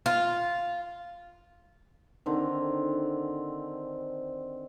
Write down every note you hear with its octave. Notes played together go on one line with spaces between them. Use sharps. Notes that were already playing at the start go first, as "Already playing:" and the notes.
F4
D3 D#3 C4